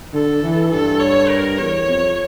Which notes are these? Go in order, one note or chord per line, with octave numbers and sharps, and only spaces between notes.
D3 A4
E3
G2 A4
C#5
A#4
E2 C#5
F2